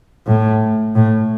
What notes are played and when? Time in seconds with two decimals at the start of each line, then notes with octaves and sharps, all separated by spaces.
0.26 A2
0.95 A2